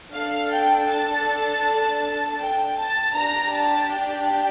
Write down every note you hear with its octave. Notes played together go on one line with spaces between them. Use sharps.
D4 A4 F5
G5
A5
G5
A5
D4 G4 A#5
A5
G5